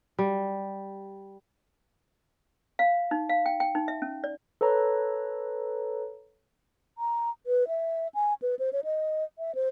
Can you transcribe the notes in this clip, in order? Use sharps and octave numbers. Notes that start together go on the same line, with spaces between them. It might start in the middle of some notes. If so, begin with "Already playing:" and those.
G3
F5
D#4
F5
G5
G5
D#4
E5
C#4
D5
A4 B4 C#5 A#5
A#5
B4
E5
G#5
B4
C5
C#5
D#5
E5
C5